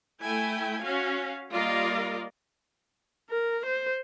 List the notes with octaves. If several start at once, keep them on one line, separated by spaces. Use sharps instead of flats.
A3 E4 G5 G#5
C#4 F#4 F5
G3 A#3 F4 A#4 D5 D#5
A#4
C5